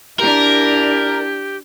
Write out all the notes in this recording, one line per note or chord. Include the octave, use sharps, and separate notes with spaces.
D4 E4 G4 A#4